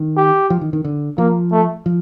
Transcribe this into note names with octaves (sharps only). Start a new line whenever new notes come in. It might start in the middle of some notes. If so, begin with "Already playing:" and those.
Already playing: D#3
G4
F3
D#3
D#3
D3
F3 A#3
A3
F3